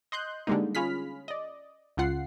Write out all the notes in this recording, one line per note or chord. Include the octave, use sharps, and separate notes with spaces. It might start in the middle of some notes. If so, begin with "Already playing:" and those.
D#5 C6 F#6 G6
D3 G3 G#3 A#3 D#4
C#4 F4 G#4 B5 F6 B6
D5 D#5
C#2 C#3 F4 F#5 C7